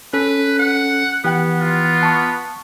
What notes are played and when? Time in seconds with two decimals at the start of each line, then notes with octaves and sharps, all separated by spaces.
0.13 C#4 A4 B4
0.59 F#5
1.25 E3 B3 G4 F#5 G5 F#6
1.61 F4
2.03 A5 C#6